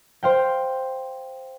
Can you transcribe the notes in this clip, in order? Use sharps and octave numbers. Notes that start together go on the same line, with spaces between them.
C5 F5 G5